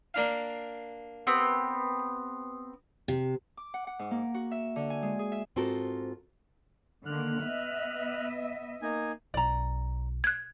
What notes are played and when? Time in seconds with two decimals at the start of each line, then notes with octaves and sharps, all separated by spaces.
0.14 A#3 D4 F5
1.27 B3 C4 G4
3.08 C3
3.57 D6
3.74 F#5
3.87 F#5
3.99 G#2
4.11 A#3
4.34 F#4
4.51 E5
4.76 D3
4.90 G#5
5.02 G#3
5.19 G#4
5.32 E5
5.56 G#2 C4 F4 F#4 A4 A#4
7.06 D3 D#3 A#3 F6 F#6
7.44 B3 D#5 E5
8.82 A#3 D#4 G#5
9.34 B1 D5 A#5
10.24 F#6 G#6